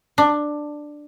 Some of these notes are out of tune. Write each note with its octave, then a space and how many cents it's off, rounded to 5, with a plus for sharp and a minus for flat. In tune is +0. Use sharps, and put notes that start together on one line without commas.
D4 +10